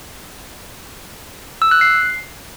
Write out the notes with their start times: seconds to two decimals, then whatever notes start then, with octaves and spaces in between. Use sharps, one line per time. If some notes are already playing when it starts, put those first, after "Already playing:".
1.62 E6
1.71 F#6
1.81 C7